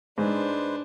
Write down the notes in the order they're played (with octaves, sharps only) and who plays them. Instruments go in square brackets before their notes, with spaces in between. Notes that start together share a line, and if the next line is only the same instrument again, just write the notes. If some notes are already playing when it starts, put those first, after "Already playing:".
[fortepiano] G#2 [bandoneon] G#3 B4 C5 [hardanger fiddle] D4